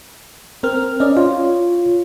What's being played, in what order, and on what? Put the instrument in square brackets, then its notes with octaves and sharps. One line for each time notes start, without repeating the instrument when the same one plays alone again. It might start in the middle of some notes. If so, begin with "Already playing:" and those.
[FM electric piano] C4 A#4 F6
C#4 D5 D#5
[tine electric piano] F4 [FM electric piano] C#5